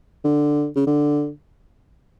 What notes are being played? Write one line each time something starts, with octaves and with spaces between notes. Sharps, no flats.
D3
C#3
D3